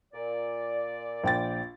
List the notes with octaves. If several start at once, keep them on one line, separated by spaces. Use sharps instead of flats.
A#2 D5
A#1 G5 A6